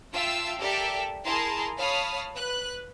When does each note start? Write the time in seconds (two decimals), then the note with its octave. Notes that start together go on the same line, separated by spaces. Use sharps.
0.14 F4 E5 F5 G5 A5 E6
0.59 G4 A4 A#4 D5 E5
1.23 E4 G#4 A#4 A5 A#5 C6
1.78 C#5 F5 A5 B5 D#6 F6
2.35 B4 F#6